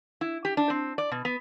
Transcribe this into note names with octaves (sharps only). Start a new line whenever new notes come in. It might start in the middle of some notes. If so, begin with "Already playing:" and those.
E4
G4
D4
C4
D5
B2
B3